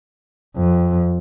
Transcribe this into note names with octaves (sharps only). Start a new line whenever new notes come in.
F2